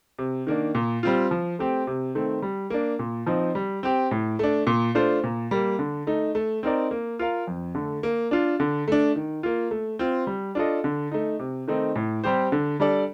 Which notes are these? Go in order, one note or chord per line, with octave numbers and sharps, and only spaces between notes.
C3
D#3 A#3 D4
A#2
G3 C4 F4
F3
A3 C4 G4
C3
D#3 A3 C4
G3
A#3 D4
A#2
F3 C4 D#4
G3
C4 G4
A2
A3 D4
A#2
A3 D4 F4 C5
A#2
G3 A#3
D3
A3 D#4
A3
C4 D#4 A#4 D5
A#3
F4 A#4 F5
F2
D3 A3
A#3
D4 F4
D3
A3 D4
D#3
A#3 F4
A3
C4 F4
G3
D4 F4 A4 D#5
D3
A3 D#4
C3
D#3 A3 C4 D#4
A2
G3 C4 G4 C5
D3
G3 D4 A4 D5